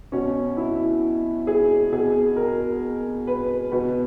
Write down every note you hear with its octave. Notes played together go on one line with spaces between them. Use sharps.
B2 C#4
E4
G#4
B2 G#4
A#4
B4
B2 B4